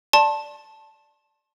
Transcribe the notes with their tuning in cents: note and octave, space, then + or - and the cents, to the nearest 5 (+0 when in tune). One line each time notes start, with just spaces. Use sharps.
D5 +0 A5 +0 C6 +40